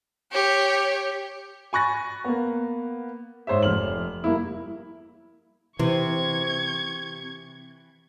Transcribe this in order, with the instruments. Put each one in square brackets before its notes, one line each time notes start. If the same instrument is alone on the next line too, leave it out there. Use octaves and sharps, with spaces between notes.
[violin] G4 C#5
[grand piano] G#5 B5 C#6 F#6 A6 A#6
A#3 B3
G#2 C5 C#5 E5
F1 F6 F#7
G3 A#3 E4
[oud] C3 [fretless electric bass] E3 [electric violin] C#6 G#6